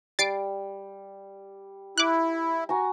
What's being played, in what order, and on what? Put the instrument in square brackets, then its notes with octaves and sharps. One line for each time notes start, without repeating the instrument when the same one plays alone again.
[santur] G3 [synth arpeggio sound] A6 C7 D7
[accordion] E4 [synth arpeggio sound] D6 F#6
[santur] F#4 G#5 A#5